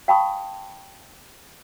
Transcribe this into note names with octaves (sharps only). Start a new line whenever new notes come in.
F5 G5 A5 B5 C#6 D#6